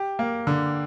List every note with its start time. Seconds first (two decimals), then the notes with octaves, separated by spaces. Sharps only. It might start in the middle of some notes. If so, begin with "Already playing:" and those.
Already playing: G4
0.19 A#3
0.47 D3